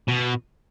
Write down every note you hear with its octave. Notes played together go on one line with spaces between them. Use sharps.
B2